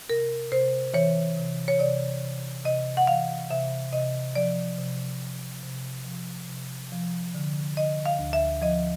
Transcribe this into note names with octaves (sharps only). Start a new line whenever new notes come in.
C3 A#4
C3 C5
E3 C#5
C3
C#5
C3 D5
C3
C3 D#5
F#5
E3 F5
C3 E5
C3 D#5
F3 D5
C3
C3
C3
F3
C3
F3
D3
D3 D#5
F5
D2
E5
F3 D#5